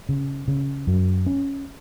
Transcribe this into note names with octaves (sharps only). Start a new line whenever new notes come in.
C#3
C#3
F#2
C#4